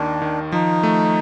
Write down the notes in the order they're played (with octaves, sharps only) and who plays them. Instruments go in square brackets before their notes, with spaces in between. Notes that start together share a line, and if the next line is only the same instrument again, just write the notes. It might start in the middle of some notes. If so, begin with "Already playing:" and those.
Already playing: [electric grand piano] D#2 D#3 [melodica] D4
[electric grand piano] D#3
[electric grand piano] F3 [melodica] D#4
[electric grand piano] A3